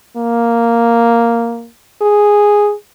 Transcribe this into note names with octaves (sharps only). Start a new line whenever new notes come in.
A#3
G#4